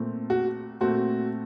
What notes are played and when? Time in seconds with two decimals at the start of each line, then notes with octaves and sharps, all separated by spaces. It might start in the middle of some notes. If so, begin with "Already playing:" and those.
Already playing: A#2 A3 C4
0.30 F#4
0.81 A#2 A3 C4 F#4